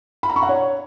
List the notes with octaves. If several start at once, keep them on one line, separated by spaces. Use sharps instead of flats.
B5
A#5
C#6
F#5
C#5